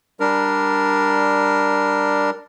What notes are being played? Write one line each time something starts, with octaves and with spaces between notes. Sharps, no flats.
G3 D4 A#4